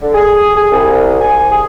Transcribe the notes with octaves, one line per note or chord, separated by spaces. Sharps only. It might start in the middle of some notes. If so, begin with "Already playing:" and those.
D3
G#4
G#4
C2
G#5
G#4